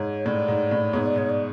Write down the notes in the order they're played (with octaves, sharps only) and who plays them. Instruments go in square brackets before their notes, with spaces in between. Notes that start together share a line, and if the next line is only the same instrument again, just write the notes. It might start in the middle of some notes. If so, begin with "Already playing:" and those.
Already playing: [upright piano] G#2 [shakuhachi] C#5
[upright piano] A2 [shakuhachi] D5
[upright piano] G#2
A2
[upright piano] G#2 B2 [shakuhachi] C#5
[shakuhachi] D5
[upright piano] G#2 [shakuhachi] C#5
[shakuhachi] D5